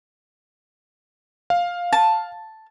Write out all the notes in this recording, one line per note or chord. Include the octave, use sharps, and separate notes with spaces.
F5
A5